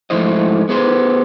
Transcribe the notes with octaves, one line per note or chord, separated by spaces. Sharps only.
G#2 F3 A3 E4 C5 D#5
B3 G#4 B4 C5